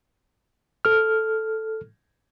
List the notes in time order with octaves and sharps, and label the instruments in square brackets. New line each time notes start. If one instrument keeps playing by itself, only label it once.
[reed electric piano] A4 F6